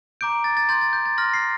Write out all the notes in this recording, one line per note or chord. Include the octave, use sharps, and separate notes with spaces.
A#5 D6 G6 D7
A6
A6
C6 G6 A6
A6
G6
A6
C6 F6 A#6
C7